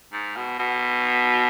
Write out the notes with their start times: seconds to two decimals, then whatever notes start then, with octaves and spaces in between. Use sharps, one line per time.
0.13 G#2
0.36 B2
0.59 B2